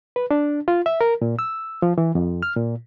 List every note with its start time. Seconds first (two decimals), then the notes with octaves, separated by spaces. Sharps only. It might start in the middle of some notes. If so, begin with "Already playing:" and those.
0.16 B4
0.31 D4
0.68 F4
0.86 E5
1.01 A#4
1.22 A#2
1.39 E6
1.82 F3
1.98 E3
2.15 F2
2.43 F6
2.57 A#2